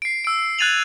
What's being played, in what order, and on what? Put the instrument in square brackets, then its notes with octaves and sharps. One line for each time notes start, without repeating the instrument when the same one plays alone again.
[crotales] C7 D7
E6 D7
F#6 G#6 A6 D#7 F7 F#7